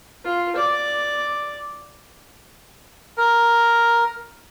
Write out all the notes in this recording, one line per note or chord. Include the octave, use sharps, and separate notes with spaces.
F4
D5
A#4